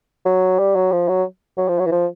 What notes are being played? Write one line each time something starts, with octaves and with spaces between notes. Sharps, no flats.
F#3
G3
F#3
F3
F#3
F#3
F3
F#3
E3
F3